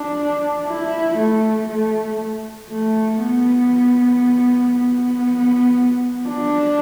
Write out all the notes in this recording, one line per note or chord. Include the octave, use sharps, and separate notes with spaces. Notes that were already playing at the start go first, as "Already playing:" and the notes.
Already playing: D4
E4
A3
A3
A3
B3
B3
D4